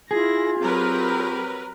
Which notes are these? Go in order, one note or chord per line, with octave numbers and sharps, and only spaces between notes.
E4 F4 G#4 A#6
F#3 C4 G4 A#4 B4